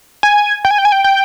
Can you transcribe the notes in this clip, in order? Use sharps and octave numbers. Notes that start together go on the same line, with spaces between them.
G#5
G5
G#5
G5
G#5
G5
G5